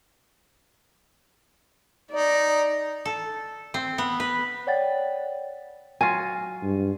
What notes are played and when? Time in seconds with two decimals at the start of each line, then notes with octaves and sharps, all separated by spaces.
2.11 D#4 D5
3.05 A4
3.74 C4
3.98 B3
4.20 B4
4.67 C#5 D5 F#5 G5 A6
6.01 F#3 F4 G#5
6.63 G2